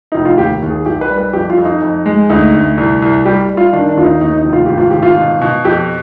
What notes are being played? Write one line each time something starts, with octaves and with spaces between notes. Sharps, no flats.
F1 D#4
F4
D#2 G4
D#2
G#4
B1 G4
B4
G3
B4
F2 G4
F4
F2
D#4
F2
G#3
D2 D#4
D2
C2
C2
G3 G4
G3
F4
D#3 D4
D4
D#2 F4
D#4
D#2 D#4
D#4
F1
F4
G#1 G4
F4
G#1 G4
F4
B2
B2
F2 G4